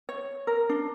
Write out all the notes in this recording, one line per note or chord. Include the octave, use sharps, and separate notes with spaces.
C#5
A#4
D4